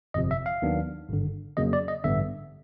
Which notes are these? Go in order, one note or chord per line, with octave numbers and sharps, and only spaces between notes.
G1 F2 C3 F3 D#5
E5
F5
D#2 D#3 F#3 B3 D4
G#1 G2 D3
F2 C#3 F#3 A#3 D#5
D5
D#5
A1 G2 D3 G3 B3 E5